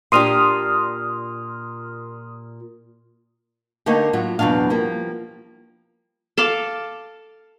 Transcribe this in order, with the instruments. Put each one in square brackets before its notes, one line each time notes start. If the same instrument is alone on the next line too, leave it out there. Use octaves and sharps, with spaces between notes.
[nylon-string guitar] A#2 D4 G4 [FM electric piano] C6 D#6 F6
[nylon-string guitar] D3 A3 A#3 D#4 G4 C#5
A2 F#3 F4
E2 B2 F#3 D4 F5
F3 G3 A#3
[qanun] A4 F5 D6